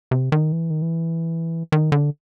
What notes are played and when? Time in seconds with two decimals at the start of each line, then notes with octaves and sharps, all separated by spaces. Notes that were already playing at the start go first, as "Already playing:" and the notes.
0.11 C3
0.32 D#3
0.52 E3
0.70 D#3
0.82 E3
1.72 D#3
1.92 D3